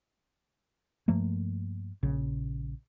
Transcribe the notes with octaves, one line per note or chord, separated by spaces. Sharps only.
G2 F3 A3 A#3
A#1 C#3